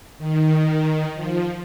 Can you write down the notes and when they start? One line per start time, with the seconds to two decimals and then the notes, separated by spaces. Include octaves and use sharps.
0.18 D#3
1.14 F3